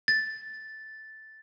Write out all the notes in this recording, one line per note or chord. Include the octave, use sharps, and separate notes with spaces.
A6